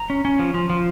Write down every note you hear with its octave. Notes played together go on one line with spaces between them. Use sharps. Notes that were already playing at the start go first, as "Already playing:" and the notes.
Already playing: A#5
C#4
C#4
F3
F3
F3